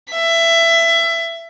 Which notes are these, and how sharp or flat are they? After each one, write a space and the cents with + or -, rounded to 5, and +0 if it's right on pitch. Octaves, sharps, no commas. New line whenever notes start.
E5 +20